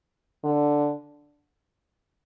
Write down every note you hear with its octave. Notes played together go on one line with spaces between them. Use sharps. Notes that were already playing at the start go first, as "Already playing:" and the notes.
D3